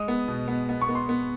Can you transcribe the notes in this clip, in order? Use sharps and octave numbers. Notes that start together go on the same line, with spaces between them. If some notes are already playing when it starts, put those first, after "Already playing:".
Already playing: G#3 D#6
B3
B2
B3
B3
C#6
B3
C6
B3